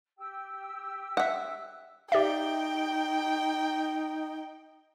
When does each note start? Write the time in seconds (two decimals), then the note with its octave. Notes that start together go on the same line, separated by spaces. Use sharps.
0.18 G4 G5 E6
1.17 E5 F#5
2.12 D#4 G4 D5 E5 G5